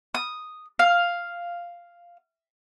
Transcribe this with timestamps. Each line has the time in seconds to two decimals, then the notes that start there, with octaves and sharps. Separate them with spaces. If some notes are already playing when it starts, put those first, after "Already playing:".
0.15 D#6
0.79 F5